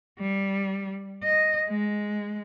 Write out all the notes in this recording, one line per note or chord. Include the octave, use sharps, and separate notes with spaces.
G3
D#5
G#3